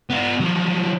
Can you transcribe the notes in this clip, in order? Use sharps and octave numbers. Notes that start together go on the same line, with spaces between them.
B3 F4
F3 F#3